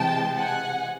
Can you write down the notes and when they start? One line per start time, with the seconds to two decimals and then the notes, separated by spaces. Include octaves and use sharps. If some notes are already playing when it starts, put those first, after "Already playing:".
Already playing: C3 E3 G#3 G5 A5
0.38 F#5 G#5